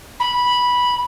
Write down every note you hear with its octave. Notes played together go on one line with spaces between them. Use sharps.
B5